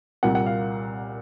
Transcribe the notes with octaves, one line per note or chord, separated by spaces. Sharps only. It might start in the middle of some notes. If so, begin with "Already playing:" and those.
C2 A#2 G3 F#5
F#5
F5